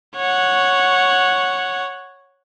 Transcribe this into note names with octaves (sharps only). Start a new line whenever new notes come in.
C#5 F#5